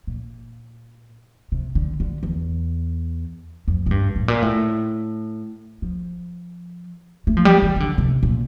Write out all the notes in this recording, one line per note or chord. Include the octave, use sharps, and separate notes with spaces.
A#2
C3
D3
D3
E2
F2
A2
G2
A2
A#2
A2
F3
A3
F3
G3
E3
E3
D3
C3
A#2